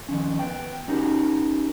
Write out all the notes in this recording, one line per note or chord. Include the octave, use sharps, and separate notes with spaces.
D#3 F3 C#4
B3 G5
C#4 D#4 F#4 G4 A#4